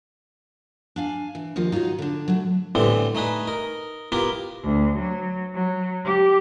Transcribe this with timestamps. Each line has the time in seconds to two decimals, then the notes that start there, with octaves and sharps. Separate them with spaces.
0.96 D4 F5 G#5
1.35 E3
1.56 D#2 F3 F4 D#5
1.72 D#4 F4 F#4 C#5 D#5
1.99 D3 D4
2.28 F#3 A3
2.75 A2 D3 E3 G3 B3 C4
3.15 A3 D#4 G#4 B4
3.47 D#4 A#4
4.12 B3 E4 F4 G4 A#4
4.63 D2
4.99 F#3
5.54 F#3
6.05 G4